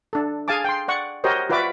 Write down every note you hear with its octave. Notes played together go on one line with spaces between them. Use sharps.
D4 A4
G#4 F5 G#5 A5 D6
G5 C6
D5 F#5 C#6
F#4 G4 A#4 C5 C#5 D#5
F4 F#4 B4 D5 E5 D6